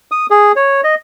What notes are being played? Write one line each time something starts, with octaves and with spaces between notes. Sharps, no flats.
D#6
G#4
C#5
D#5